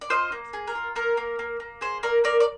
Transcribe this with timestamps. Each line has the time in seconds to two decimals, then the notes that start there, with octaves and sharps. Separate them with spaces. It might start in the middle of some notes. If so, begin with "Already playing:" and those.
0.01 D5
0.10 F4 C5 D#5
0.32 A#3
0.53 G#4
0.68 A#4
0.75 F4
0.96 A#3 A#4
1.17 A#3
1.39 A#3
1.60 A#3
1.81 G#4 C5
2.03 A#3 A#4 D5
2.24 A#3 A#4 D5
2.40 D5